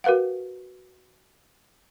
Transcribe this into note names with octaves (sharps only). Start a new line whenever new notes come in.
F#4 A#4 B4 F5 F#5